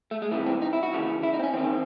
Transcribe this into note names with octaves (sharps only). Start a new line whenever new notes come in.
A3
G#3
C2 C3 E3 A3
C4
D#4
E4
F#4
D#2 C#3 E3
E4
D#4
C4
C#4
E2 D#3 C4